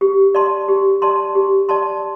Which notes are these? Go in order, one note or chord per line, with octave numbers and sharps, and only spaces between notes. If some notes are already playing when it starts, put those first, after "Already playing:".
G4
D5 A5 C6
G4
D5 A5 C6
G4
D5 A5 C6